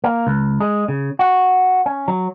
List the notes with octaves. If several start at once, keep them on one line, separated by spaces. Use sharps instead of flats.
A#3
C#2
G#3
C#3
F#4
C#4
F#3